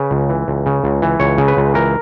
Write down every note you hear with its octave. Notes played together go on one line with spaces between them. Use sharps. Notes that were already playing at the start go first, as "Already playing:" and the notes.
Already playing: C#3 B4
C#2
E3
C#2
C#3
C#2
E3
C#2 C#5
C#3
B4
C#2
E3 A#4